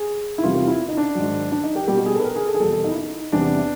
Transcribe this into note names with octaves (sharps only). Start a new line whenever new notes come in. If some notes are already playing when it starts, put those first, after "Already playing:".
Already playing: G#4
E4
E2 C3 E3 G3 F4
F4
E4
D#4
D4
G#2 D#3 F#3
D4
D#4
G4
B2 G3 G4
F#4
G#4
A4
B4
A#4
G#4
A4
G#4
E2 B2 G3 A4
A4
D#4
E4
D#4
E2 C3 E3 G3 D4